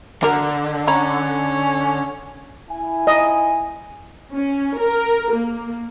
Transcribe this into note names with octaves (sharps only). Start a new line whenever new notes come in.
D3 D4 F#4 A#4
C#4 A#5 B5
E4 G#5
D#5
C#4
A#4
A#3